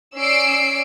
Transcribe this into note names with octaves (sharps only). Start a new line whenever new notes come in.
C#4 D5 E6 C7 D7